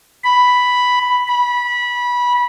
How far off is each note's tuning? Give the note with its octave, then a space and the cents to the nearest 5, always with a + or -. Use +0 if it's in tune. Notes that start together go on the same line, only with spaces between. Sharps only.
B5 +0
B5 -20